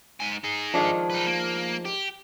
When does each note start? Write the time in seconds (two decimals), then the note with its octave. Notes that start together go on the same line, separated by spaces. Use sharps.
0.20 G#2 G#5
0.44 D#4 G#4
0.74 D#3 F3 G#3 D4
1.10 D#4 B4
1.27 A#3
1.85 G4